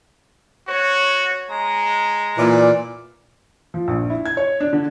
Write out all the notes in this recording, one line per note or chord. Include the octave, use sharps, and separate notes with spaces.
F#4 C#5
G#3 A#5
A#2 E3 E4 D5
F3
A#1
E4
G#6
C#5
D4
D3